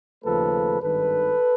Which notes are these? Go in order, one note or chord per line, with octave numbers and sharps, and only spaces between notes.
D#2 C#3 F3 A3 A4 B4
G#1 G2 D#3 A4 B4